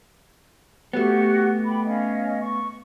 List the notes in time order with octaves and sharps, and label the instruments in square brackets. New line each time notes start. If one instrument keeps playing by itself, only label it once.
[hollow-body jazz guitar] A3 B3 [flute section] F#4 G4
[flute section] G5 B5 D6
C#4 D#5 F5
C#6